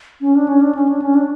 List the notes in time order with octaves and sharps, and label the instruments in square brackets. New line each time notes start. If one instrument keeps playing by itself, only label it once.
[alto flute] C#4
D4
C#4
D4
C#4
D4
C#4
D4